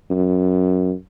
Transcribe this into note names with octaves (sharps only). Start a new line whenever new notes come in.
F#2